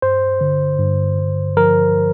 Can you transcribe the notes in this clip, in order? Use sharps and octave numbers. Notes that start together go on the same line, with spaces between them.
G2 C5
D3
G2
G2
F3 A#4